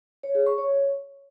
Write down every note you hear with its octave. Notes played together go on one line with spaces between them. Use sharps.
C#5
G#4
C#6
C#5